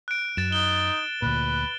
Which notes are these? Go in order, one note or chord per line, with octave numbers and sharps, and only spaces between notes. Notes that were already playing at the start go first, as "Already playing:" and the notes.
F#6 D7
F#2 A6 E7
D#4 G7
D2 A#2 B4